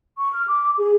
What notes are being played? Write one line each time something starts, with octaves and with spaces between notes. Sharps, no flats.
C#6
F6
D6
G#4